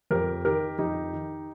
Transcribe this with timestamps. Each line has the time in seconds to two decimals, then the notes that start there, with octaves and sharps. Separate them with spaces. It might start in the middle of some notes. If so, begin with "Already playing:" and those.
0.11 F2 G4 A#4
0.45 D#3 G4 A#4
0.78 F2 D#4 G4
1.13 D#3